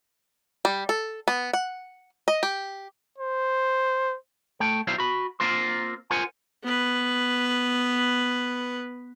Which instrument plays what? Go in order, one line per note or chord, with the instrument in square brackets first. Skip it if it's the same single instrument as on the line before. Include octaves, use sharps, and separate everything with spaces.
[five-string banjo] G3
A4
B3
F#5
D#5
G4
[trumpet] C5
[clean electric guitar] A3 G5
B1 F#3 G3 E4 C5 F5
F#4 B5
A#3 C4 F4 A#4 C5
F4 A#4 C5 F#5 G#5
[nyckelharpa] B3 B4